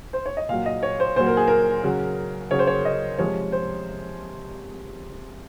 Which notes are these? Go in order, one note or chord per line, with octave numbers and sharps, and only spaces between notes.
C5
C#5
D#5
A#2 F#3 F5
D#5
C#5
C5
A#2 F#3 C5
A#4
G#4
A#4
C#3 F#3
C#3 F#3 C#5
C5
C#5
D#5
C3 F3 G#3 C#5
C5